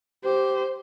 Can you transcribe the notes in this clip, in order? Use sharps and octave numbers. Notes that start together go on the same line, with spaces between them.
G4 C5